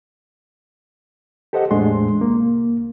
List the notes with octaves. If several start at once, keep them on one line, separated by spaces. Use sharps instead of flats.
G4 A4 C5 D#5 F#5
E2 A2 G#3 A3 D4 C6
C2 A#3